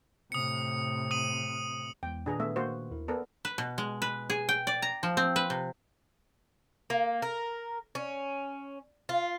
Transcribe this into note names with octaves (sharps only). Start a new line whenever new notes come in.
A2 C3 D#6 C#7
D#6 D#7 F#7
E2 G#3 G5
A#2 D#3 D4 G#4 B4 A#5
A3 B3 E5
A#3 F#4 C5
D#2 E4 A#4
B3 A4 A#4 D5
B4
B2
G#3
B4
G#4
G5
D5
A#5
F3
C4
B4
C3
A#3
A#4
C#4
F4